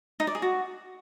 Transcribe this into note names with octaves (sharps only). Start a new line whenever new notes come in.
D#4
D5
G#4
F#4